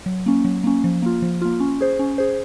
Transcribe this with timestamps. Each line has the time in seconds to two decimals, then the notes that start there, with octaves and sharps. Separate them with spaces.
0.06 F#3
0.26 A#3 C#4
0.45 F#3
0.64 A#3 C#4
0.84 F3
1.02 A#3 F4
1.22 F3
1.41 A#3 F4
1.60 C#4
1.81 G#4 C5
1.99 C#4
2.18 G#4 C5